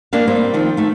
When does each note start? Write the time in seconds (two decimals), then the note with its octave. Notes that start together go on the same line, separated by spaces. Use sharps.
0.13 A#3 D4 G4 F5
0.27 G3 A#3 C4
0.54 D#3 F3 C4
0.77 D#3 A3